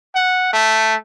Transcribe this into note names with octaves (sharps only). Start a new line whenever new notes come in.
F#5
A3